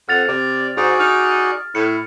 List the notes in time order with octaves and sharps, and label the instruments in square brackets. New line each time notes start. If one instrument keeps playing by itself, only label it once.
[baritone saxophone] F2 [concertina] F#5 [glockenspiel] F6 A6 F7
[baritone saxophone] C3 [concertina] D5
[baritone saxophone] G#2 [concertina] F#4 G#4 D5
[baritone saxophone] D#4 [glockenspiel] F6
[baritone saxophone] A2 [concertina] E4 [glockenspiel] C#7